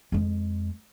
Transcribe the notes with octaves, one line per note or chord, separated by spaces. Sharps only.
F2 G#3